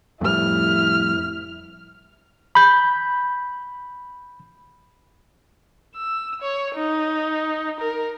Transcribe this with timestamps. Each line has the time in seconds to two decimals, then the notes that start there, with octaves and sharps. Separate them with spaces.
0.21 F2 A2 G3 E4 F6
2.55 B5 G6
5.96 E6
6.42 C#5
6.75 D#4
7.80 A#4